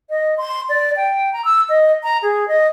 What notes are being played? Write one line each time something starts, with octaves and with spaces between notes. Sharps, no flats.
D#5
C6
D5
G5
A#5
E6
D#5
A#5
G#4
D#5